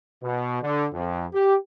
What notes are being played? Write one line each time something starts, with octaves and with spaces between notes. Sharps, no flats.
B2
D3
F2
G4